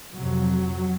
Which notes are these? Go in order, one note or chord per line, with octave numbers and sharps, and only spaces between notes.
F2 C3 F#3